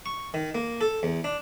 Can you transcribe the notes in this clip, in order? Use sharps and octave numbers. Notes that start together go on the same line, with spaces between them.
C#6
D#3
A#3
A4
E2
D4